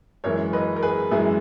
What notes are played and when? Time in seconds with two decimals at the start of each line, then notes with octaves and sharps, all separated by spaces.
0.24 F#2 E3 G#3 A#4 C#5
0.53 B4 D#5
0.76 A#4
0.83 G#4 B4
1.11 F#2 E3 G#3 E4 G#4